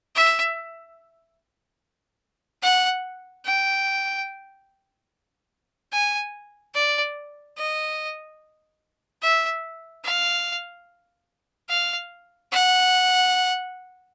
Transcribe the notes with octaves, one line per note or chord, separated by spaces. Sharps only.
E5
F#5
G5
G#5
D5
D#5
E5
F5
F5
F#5